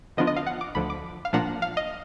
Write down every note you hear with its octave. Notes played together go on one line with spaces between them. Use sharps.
D3 F3 B3 D4 F4 D#5
D#5
F5
F#5
D6
D2 D3 F3 B5
D6
F5
A#2 F3 A#3 D4 F#5
F5
D#5